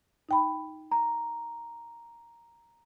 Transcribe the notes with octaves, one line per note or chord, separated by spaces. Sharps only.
D#4 G5 B5
A#5